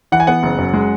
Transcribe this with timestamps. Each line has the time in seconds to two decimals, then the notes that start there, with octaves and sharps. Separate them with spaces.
0.12 E3 F#5
0.20 G#5
0.27 B3 F#5
0.43 F#1
0.58 F#2
0.74 G#3